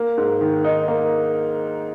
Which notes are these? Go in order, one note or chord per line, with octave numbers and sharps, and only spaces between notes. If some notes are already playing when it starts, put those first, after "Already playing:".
Already playing: A#3
G#2
D#3
D#4
A#3